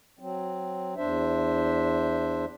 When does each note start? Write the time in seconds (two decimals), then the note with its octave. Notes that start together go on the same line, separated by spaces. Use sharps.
0.19 F#3 C4
0.96 E2 D4 C5 E5